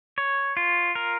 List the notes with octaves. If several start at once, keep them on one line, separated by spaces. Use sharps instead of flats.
C#5
F4
A#4